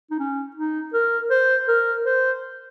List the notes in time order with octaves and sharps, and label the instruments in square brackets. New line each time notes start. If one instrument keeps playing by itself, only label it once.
[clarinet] D#4
C#4
D#4
A#4
C5
A#4
C5